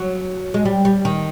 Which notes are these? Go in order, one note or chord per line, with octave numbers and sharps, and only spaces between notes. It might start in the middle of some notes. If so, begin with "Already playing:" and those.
Already playing: F#3
G#3
G3
G3
D#3